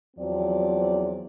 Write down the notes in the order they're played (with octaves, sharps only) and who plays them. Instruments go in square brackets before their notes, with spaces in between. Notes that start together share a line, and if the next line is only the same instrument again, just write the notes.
[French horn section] E2 F3 F#3 C4 D5